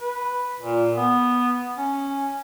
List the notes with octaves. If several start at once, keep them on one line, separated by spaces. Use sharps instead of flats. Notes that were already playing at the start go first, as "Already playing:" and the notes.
B4
A#2
B3
C#4